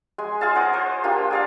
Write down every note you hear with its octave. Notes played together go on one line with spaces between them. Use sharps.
G#3 G#5
F4 G#4 F5 A5
C5 F#5 A#5 D6
C5
A#3 D4 F4 G4
G#4 D5 F5